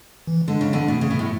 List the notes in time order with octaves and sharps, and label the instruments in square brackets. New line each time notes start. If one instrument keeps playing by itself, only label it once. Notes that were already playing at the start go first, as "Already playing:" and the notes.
[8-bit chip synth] E3
[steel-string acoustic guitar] D3 [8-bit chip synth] G#3
[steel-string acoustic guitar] C#3
B2 D3
[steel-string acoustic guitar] B2 [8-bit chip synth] A3
[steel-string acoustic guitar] C#3
B2
A2